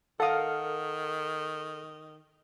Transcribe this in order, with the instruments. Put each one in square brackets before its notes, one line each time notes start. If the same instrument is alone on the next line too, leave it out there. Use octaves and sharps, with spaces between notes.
[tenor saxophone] D#3 [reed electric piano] A4 D#6 [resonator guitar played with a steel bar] A#4 F5 F#5